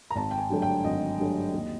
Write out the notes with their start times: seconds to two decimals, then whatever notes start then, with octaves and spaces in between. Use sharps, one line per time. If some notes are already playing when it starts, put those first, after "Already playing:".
0.10 A#5
0.16 G#1 A5
0.31 G5
0.38 G#5
0.50 G2 D3 F#3 A3
0.62 G5
0.84 G#1 D#5
1.20 G2 D3 F#3 A3
1.53 D#2